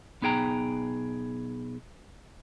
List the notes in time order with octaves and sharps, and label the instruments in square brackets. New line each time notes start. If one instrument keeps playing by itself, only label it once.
[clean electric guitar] B1 B3 D#4 G#4 G5 A#5